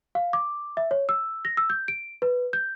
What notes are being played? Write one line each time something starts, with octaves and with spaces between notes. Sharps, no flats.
F5
D6
E5
C#5
E6
A#6
E6
G6
D7
B4
G6